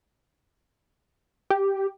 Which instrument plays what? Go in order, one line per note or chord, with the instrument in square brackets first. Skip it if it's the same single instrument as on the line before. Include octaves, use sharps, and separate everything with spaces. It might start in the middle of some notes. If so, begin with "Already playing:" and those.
[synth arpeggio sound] G4